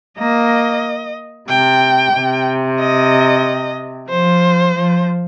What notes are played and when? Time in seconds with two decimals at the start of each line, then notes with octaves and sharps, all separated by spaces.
0.18 A#3 D#5
1.49 C3 G5
2.14 C3
2.80 D#5
4.10 F3 C5
4.75 F3